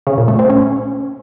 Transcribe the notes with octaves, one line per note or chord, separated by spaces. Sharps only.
C#3
A#2
A3
C4
C#4